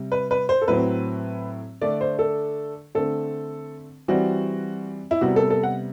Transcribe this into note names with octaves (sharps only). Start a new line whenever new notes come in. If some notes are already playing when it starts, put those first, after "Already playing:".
Already playing: C3 G3
B4
B4
C5
A4
A2 F#3 C4 B4
D3 A3 D4 D5
C5
A4
D3 A3 C4 A4
E3 G3 C4 F#4
E4
C3 G3 B3 F#4
A4
A4
F#5